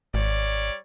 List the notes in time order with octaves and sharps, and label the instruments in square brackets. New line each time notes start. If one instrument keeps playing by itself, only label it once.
[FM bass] G#1 [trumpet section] G3 C#5 D5